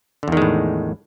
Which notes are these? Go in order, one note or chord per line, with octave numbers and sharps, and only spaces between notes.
E2 A2 D3 D#3 G#3